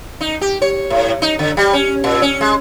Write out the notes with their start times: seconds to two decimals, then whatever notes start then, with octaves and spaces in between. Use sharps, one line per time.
0.21 D#4
0.41 G4
0.62 C#5
0.90 A2
1.22 D#4
1.39 D3
1.57 G3
1.73 C#4
2.04 A#2
2.22 C#4
2.41 G#3